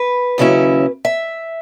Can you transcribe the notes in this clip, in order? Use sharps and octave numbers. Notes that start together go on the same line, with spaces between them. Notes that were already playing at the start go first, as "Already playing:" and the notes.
Already playing: B4
D#2 C#3 F#3 C#4 E4
E5